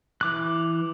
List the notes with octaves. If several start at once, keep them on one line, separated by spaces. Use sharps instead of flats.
E3 D6 F#6